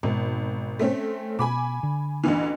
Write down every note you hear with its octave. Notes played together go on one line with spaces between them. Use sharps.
G#1 G#2 B2
A3 C4 C#4
B2 G#5 B5 D6
D3
A1 D2 E3